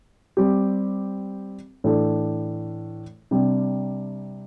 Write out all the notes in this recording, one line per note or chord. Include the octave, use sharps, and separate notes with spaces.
G3 C4 G4
A2 E3 A3 D4
C3 G3 D4